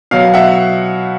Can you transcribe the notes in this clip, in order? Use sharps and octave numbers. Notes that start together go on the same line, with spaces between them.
B2 F#3 F5
E5 F#5